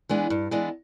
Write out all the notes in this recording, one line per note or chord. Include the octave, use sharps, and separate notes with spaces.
E3 G#3 B3 D4
G2
E3 G#3 B3 D4